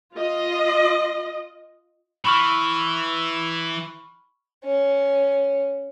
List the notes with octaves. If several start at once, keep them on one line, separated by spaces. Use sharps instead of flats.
F4 D#5
E3 B5 C#6 F6
C#4